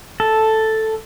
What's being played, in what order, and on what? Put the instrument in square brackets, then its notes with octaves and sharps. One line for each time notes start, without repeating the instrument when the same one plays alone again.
[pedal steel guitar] A4